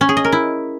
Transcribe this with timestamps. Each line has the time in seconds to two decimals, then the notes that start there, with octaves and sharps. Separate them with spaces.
0.01 C#4
0.09 G#4
0.17 D#5
0.25 A#4
0.32 E4